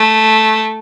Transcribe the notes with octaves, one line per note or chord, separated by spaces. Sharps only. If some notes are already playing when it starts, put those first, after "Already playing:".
Already playing: A3